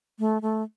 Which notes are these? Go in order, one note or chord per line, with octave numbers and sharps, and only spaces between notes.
A3
A3